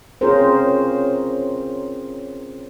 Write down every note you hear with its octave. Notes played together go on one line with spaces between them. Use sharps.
C4 C#4 F4 G#4 A#4 C5